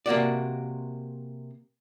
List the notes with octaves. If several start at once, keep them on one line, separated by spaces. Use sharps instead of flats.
C3 A#3 F#4 D5